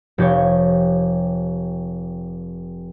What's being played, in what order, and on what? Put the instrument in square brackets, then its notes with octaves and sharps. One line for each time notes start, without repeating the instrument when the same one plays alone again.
[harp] F1 G4 C#5